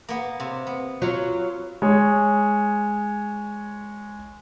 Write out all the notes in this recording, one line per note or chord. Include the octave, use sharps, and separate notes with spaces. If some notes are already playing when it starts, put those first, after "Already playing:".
A#3 B3
C3
B3
F#3 F4
G#3 C#5